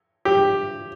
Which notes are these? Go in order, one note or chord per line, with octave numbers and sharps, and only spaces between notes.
G4